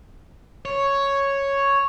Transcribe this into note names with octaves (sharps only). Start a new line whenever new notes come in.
C#5